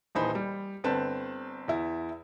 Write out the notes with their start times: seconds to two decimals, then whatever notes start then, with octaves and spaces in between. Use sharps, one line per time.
0.15 D#1 E3 D#4 C5 B5
0.35 G3
0.84 G1 C4 B4 A5
1.68 E2 E4